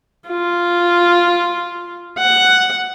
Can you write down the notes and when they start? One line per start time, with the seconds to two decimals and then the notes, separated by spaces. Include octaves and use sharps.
0.29 F4
2.19 F#5